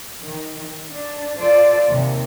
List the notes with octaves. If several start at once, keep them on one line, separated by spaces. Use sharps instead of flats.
D#3
D4
F4 A4 C5 D5
D#2 C3